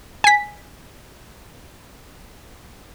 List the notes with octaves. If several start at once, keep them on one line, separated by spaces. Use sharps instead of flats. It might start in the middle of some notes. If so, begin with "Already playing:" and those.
G#5 B6